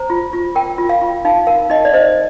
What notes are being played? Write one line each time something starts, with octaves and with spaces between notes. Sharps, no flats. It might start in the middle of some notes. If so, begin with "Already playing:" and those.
Already playing: C5 A#5
F4
F4
A#4 G5
F4
F5
F4
D#4 F5
A#4 F5
D#4 D#5
D5
C5 D#5